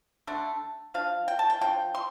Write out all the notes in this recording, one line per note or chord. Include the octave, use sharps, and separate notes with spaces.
D3 A3 D4
F3 D4 F5
G5
A5
G5
F3 D4 G5
C6